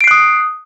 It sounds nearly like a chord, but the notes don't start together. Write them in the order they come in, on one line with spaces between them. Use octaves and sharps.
D7 C7 F#6 D#6